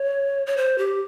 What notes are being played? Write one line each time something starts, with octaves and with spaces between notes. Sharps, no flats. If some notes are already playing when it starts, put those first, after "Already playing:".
Already playing: C#5
C#5
C5
G4